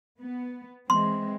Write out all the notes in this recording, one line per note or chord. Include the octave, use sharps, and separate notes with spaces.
B3
E3 G#3 C4 C6